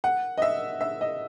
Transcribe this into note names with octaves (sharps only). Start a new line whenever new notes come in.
F#5
D#5
E5
E5
D#5